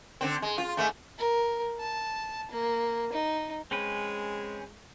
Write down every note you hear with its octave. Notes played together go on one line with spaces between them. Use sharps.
D3 C4
G#3
F4
G#2 A3
A#4
A5
A#3
D#4
G#3 C4 C#4 B4